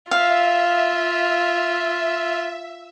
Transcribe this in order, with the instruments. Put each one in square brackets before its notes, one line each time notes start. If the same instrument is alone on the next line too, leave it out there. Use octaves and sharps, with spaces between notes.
[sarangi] F4 [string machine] E5 [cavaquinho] F5